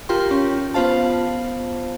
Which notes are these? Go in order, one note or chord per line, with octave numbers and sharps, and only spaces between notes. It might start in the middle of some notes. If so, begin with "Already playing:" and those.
F4 G4 A#4 G5 C6
C#4
B3 F4 C5 F5 A5